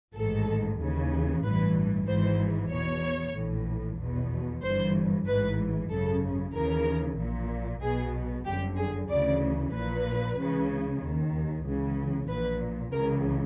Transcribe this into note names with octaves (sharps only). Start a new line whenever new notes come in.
A1 G#2 D#3 A4
D#2 C#3 E3
A1 G2 E3 B4
G#1 G#2 E3 C5
E2 B2 C#5
A#1 A2 E3
E2 B2
G1 G2 E3 C5
A1 G#2 E3 B4
G#1 F#2 C#3 A4
D#2 C#3 E3 A#4
A#1 A#2
B1 B2 G#4
G1 F#2 D3 G4
G#4
D2 C#3 E3 D5
A#1 A#2 B4
C#2 C#3 E3
D#2 D#3
C#2 C#3 E3
A#1 A#2 B4
C#2 C#3 E3 A#4